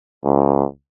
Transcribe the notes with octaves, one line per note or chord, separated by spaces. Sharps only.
C#2